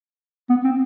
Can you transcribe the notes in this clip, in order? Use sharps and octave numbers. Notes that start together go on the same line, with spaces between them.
B3
C4